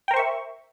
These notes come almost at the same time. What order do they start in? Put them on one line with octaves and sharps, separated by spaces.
G5 A#4 C5 C#6 E5